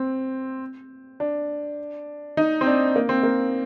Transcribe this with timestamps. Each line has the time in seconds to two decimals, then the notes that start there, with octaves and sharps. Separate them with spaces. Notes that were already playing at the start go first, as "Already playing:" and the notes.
Already playing: C4
1.20 D4
2.37 D#4
2.61 C4
2.66 D4
2.96 A#3
3.09 C4
3.23 A#3